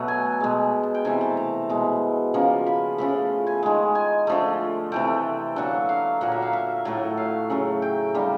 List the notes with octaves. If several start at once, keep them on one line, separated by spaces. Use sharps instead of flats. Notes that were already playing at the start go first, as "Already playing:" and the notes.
Already playing: B2 F#3 A3
G#5
B2 G#3
A5
G5
C3 E3 A3 G#5
A5
A#5
B2 G#3
C#3 F3 A#3
B5
C#3 F3 A3 B5
G#5
D#3 G#3
G#5
D3 F3 A3
C3 E3 A3 G5
D3 F#3 A#3 F#5
F5
A#2 F#3 A#3 F#5
E5
F5
E5
A2 F#3 A3
F5
C#3 F#3 A3
G5
D3 G3 A#3